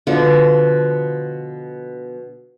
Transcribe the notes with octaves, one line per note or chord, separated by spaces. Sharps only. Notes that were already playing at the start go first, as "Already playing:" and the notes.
B2 D3 F3